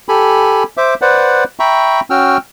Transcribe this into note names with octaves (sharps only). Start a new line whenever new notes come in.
G4 A4 G#5 B5
C5 E5 D6
B4 C5 D5 F#5
E5 G5 A#5 B5 C#6
C#4 F#4 G5 E6 F6